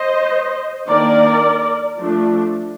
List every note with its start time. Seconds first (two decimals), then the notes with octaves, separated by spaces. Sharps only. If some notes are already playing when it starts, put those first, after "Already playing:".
Already playing: C5 D#5
0.87 D#3 A#3 D4 A#4 D5
1.97 F3 A3 D4